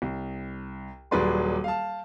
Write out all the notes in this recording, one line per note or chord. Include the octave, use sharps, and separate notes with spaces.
C2
D#1 F#3 G#4 B4 D5 C6
F5 A5